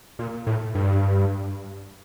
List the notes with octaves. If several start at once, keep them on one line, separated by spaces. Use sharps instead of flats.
A#2
A2
G2